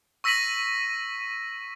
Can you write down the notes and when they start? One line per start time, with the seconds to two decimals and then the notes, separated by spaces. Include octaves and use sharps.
0.24 C#6 E6 A#6 B6 D#7 F#7